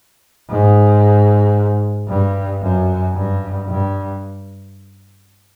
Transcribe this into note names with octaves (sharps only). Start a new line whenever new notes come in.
G#2
G2
F#2
G2
G2